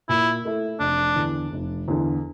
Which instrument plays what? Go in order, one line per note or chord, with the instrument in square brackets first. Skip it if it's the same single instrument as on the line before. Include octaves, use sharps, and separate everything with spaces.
[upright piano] A#2 [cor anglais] E4
[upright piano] A3 E4 A4
[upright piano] F1 [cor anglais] D4
[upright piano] E2 D3
F1
E2 D3